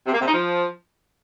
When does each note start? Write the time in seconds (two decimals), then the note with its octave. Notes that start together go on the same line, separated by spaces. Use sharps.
0.06 C3
0.13 A#3
0.20 C3
0.27 D#4
0.34 F3